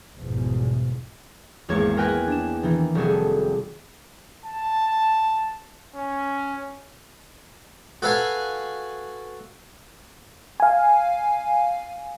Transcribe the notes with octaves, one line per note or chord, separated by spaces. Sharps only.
G1 E2 G#2 B2 F3
G#1 E2 G#3 A#3 C#5 G#6
A#4 B4 G5 G#5 F#6 A#6
D4 E7
D#3 E3
F1 G3 F#4 G#4 A4
A5
C#4
F#4 A4 B4 F5 G#5
F5 G#5